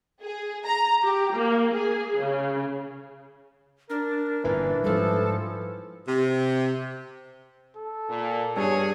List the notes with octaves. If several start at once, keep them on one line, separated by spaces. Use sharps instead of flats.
G#4
A#5
G4
A#3
G#4
C#3
D4 A#4
G1 A#2 E3
G#2 F3 G3 A4
C3
A4
A#2
G2 E3 B3 G#4 C#5